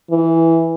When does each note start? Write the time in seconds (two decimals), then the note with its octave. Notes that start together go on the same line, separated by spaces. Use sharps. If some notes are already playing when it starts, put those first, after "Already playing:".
0.11 E3